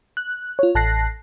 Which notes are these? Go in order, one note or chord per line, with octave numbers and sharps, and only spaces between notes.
F#6
F4 C#5
A1 A5 F#6 A#6 C7